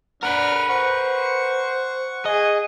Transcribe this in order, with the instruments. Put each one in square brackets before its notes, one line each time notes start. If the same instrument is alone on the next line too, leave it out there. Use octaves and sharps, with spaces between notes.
[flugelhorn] D4 [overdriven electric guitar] A#4 B4 [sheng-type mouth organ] F#5 F6
[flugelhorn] C5 [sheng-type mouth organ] F#5 C#6
[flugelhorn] G#4 [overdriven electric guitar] D#5